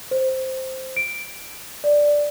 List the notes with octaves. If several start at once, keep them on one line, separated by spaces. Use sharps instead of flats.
C5
D7
D5